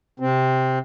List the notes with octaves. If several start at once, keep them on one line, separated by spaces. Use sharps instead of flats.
C3 C4